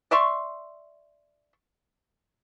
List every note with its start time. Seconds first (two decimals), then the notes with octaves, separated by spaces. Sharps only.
0.11 D5 E5 C6 C#6